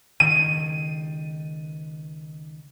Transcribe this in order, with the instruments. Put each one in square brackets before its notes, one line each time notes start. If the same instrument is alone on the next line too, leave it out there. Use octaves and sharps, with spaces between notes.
[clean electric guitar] C#2 D#3 [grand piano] D#7